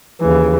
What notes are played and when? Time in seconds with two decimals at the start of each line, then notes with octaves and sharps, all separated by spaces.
0.20 D#2 C#3 E3